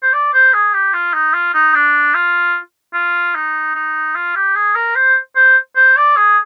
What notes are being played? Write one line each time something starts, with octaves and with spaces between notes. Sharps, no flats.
C5
D5
C5
G#4
G4
F4
D#4
F4
D#4
D4
F4
F4
D#4
D#4
F4
G4
G#4
A#4
C5
C5
C5
D5
G#4